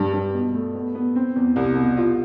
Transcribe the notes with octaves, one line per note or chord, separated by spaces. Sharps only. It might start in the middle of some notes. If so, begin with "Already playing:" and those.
Already playing: G2
G2
B2
A3
B3
B3
C4
E2
C2
B2
F4